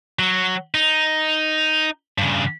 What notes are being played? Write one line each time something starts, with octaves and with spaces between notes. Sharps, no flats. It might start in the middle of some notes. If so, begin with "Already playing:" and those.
F#3
D#4
G2 C#3